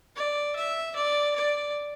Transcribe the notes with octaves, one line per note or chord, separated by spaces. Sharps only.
D5
E5
D5
D5